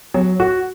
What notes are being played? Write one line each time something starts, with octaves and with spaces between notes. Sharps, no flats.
F#3
F#4